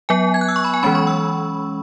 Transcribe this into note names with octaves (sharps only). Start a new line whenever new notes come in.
F#3 B3 G#5
G#6
F#6
E6
C#6
B5
G#5
E3 G#3 C#4 B5
C#6
E6